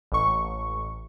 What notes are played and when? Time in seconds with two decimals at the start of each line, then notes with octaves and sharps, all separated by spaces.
0.12 A1 C#6